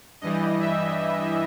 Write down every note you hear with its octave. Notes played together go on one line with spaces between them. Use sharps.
G2 E3 G3 D#5
E5